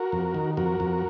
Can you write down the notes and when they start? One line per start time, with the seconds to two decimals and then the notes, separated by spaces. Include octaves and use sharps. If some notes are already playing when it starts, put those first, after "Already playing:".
Already playing: F#4 A#4
0.12 F2
0.34 D#3
0.57 F2 F#4 A#4
0.80 F2